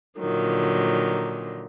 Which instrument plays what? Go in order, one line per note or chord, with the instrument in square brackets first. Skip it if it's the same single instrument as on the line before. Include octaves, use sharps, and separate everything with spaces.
[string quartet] A#2 D3 D#3 F3 F#3